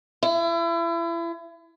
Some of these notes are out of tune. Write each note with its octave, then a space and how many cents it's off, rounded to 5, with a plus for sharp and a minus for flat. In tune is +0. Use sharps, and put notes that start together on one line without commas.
E4 +35